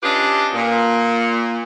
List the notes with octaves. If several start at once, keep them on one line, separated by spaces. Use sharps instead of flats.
C#4 D4 F4 G4 B4 D#5
A#2